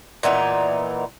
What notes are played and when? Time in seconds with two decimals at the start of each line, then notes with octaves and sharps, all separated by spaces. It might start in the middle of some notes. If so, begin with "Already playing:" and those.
0.23 A#2 E3 B3 D#4